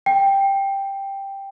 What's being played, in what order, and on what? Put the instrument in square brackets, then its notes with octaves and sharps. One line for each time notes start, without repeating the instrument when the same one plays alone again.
[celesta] G5